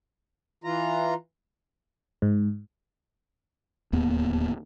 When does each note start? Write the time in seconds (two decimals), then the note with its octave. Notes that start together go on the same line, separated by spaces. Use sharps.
0.64 E3 F4 A#5
2.22 G#2
3.93 D1 D#2 A#3 B3